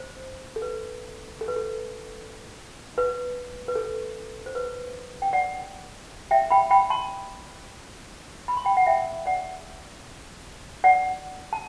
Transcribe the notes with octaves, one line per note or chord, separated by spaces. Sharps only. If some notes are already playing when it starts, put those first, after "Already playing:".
Already playing: C5
A4
B4
A4
B4
A4
B4
B4
A4
C5
B4
G5
D5 F#5
E5 G5
G5 B5
G5 B5
A5 C6
B5
C6
G5 B5
F#5
E5 G5
D5 F#5
D5 F#5
A5